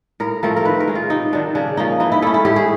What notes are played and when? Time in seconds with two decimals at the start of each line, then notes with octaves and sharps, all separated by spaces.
0.20 A2 A#4
0.43 F3 A3 C4 A#4
0.56 A#4
0.65 D#3 B4
0.80 A#4
0.88 G#3 C#4
0.95 F4
1.10 C3 D#4
1.32 D#3 F#3 D4
1.55 C#3 D4
1.77 F3 A#3 C#4 D#4
2.00 E3 D#4
2.12 E4
2.22 A3 C#4 E4
2.34 E4
2.45 A2 G4
2.56 G#4